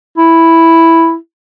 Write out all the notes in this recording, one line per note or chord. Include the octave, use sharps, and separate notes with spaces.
E4